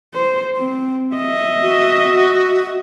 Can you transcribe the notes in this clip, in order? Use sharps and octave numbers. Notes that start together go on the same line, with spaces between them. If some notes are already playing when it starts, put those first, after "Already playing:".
C5
C4
D#5 E5
F#4